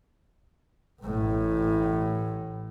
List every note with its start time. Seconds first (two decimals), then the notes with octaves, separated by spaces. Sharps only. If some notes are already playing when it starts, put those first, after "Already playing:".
1.02 A1 A2